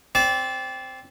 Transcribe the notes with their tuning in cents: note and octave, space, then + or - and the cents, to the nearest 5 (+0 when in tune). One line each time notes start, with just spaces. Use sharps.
C4 +0 D5 -25